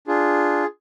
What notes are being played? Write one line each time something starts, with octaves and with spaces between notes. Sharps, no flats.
D4 F4 G#4